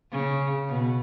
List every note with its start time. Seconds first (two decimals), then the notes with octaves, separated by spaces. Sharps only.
0.11 C#3
0.68 B2